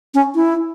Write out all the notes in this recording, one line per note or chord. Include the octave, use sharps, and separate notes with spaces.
C#4
E4